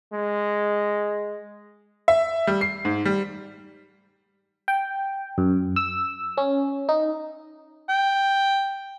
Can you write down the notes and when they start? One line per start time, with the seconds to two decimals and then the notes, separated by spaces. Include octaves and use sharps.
0.13 G#3
2.08 E5
2.47 G3
2.61 C7
2.85 G#2
3.05 G3
4.68 G5
5.38 F#2
5.76 E6
6.38 C#4
6.89 D#4
7.89 G5